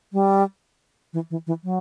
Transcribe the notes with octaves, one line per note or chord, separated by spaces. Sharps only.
G3
E3
E3
E3
F#3